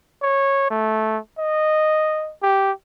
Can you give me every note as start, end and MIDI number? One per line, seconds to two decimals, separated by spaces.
0.23 0.67 73
0.71 1.18 57
1.39 2.33 75
2.43 2.72 67